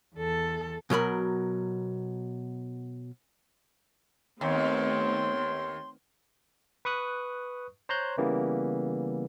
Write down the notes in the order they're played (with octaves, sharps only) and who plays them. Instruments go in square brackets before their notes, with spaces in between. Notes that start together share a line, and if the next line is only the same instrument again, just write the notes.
[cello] E2 A4
[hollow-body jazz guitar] B2 F#3 A#4 B5
[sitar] D#2 [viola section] A3 B3 C4 [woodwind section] C#5 G5 C6
[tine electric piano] B4 C#6 D#6 F#6
C5 C#5 A#5 C6 F#6 G6
C#3 E3 G3 A#3 B3